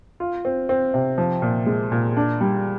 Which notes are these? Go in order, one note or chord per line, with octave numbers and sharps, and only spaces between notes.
F4
C4
C4
C3
F3
A#2
G#3
A#2
D4
G3